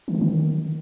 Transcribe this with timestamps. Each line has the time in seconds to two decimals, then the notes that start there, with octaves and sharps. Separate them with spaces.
0.08 D#3
0.15 C#3
0.21 D#3